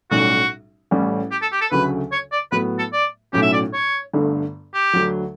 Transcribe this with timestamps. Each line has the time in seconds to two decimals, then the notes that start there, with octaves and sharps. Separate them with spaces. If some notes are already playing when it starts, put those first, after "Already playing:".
0.11 B1 A2 G3 C#4 F#4
0.91 A1 A2 G3 C#4
1.31 G4
1.42 A4
1.52 G4
1.61 A4
1.71 D2 C#3 F#3 A3 B4
2.12 C#5
2.32 D5
2.52 A2 F#3 B3 B4
2.79 A4
2.93 D5
3.33 B1 A2 F#3 C#4 G4
3.42 E5
3.53 D5
3.73 C#5
4.13 G1 G2 D3 A3
4.74 G4
4.93 D2 D3 F#3